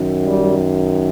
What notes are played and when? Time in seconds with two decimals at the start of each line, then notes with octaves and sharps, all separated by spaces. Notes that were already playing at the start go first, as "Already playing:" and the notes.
Already playing: F#2 D#3
0.24 G3